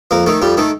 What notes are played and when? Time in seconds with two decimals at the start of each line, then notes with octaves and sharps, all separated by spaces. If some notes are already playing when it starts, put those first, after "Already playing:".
0.11 F2 A#3
0.26 D#3 A3
0.42 F2 G3
0.57 D#3 A3